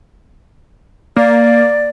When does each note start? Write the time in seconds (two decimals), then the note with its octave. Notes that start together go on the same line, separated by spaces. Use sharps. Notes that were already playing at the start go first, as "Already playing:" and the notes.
1.16 A#3 D5